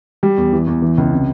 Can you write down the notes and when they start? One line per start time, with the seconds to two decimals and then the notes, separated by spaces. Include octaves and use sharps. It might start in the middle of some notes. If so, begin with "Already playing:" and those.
0.23 G3
0.37 E2
0.53 E3
0.67 E2
0.82 E3
0.98 C#2
1.12 C3